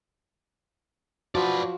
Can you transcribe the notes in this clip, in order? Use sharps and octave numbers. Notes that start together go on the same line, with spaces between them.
F3 F#4 B4 D5